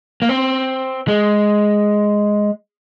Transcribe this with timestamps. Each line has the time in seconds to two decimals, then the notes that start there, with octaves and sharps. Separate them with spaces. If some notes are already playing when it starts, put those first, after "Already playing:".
0.22 A#3
0.29 C4
1.08 G#3